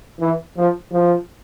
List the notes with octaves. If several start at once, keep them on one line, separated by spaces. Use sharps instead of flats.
E3
F3
F3